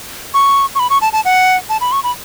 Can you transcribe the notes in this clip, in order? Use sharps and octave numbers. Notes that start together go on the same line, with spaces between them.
C#6
C#6
B5
C#6
A5
A5
F#5
A5
B5
C#6
B5